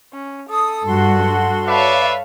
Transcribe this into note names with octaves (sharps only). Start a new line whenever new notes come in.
C#4
A4 D#6
G2 F#4 C6
B4 C#5 D5 E5 F5 A5